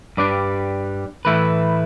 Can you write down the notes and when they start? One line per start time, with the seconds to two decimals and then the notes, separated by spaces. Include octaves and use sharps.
0.17 G2 G3 D4 B4 D5
1.25 A2 E3 A3 E4 B4